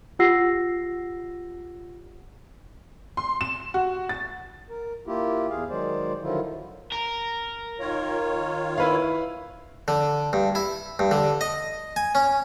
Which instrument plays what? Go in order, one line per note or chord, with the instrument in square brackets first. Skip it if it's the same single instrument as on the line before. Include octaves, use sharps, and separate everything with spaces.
[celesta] F4 G4 F#5 E6 A#6 C7
[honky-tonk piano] C6
E7
F#4
A6
[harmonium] A#4
A#3 E4 F4 G4
E2 G#4 F5
D#3 F#3 G#3 C5 D5
D3 D#3 F3 F#3 E4 F4
[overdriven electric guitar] A#4
[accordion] D#3 F4 C#5
[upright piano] E4 B4 F5
[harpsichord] D3
G2
E4
G2
D3
D#5
G#5
C#4